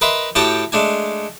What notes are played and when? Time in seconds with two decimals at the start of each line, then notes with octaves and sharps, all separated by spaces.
0.01 A#4 B4 D#5 E5 A#5 C6
0.35 A2 F#4 G4 G5 A5 D#6
0.72 G#3 A3 D4 G#5